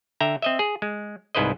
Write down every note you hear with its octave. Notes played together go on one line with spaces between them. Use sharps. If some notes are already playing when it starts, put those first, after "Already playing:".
D3 E5 G5 A#5
C4 D#5 E5
G#4
G#3
C2 G#2 E4 B4 C5 D#5